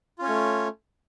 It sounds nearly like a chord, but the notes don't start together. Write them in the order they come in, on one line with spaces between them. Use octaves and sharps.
F4 C#4 C#5 A3